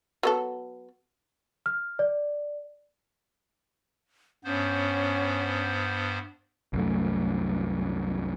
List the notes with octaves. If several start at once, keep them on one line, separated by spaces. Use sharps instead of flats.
F#3 B3 A4
F6
D5
G2 B3 C#4 C5
C2 F#2 A3